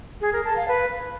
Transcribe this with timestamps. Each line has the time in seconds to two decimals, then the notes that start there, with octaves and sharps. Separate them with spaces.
0.21 G#4
0.33 A#4
0.45 A5
0.56 F5
0.68 B4